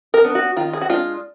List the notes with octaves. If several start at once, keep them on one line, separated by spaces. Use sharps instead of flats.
A#4
B3 D4
F#4
D#3 F4
G#4
F#4
G#3 D4 F4